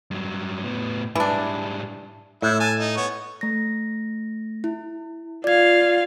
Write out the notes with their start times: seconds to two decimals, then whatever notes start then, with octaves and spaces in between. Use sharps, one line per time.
0.11 G2 F#3
0.64 A2 B3
1.15 G#2 E3 G3 D4
2.42 A2 E4
2.60 G#5 A5
2.79 D#4
2.97 B3 C#5
3.41 A3 A#6
4.64 E4
5.44 F4 D5 F5 G#6